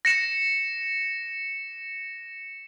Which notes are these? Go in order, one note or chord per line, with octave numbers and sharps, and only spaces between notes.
A#6 C#7 E7